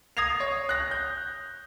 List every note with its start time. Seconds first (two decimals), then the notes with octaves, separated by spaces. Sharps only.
0.17 D#6 G#6 A#6 C7 F7
0.40 C#5
0.69 F#6 A#6
0.91 G6